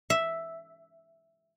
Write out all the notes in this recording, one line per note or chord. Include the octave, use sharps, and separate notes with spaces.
E5